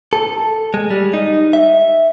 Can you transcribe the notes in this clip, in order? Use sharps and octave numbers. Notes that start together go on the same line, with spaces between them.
A4
G#3
G3
D#4
E5